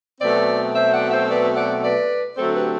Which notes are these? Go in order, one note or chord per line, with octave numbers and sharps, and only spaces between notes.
B2 F#3 A3 C4 B4 D5
C5 E5
D5 F#5
C5 E5
B4 D5
D5 F#5
B4 D5
D3 F#3 A3 C4 A4 C5
G4 B4